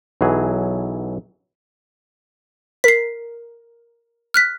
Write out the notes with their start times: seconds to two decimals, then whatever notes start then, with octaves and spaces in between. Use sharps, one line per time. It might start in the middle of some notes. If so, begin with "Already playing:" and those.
0.21 B1 E3 F#3 G#4
2.84 A#4 B6 C7
4.34 F6 F#6 B6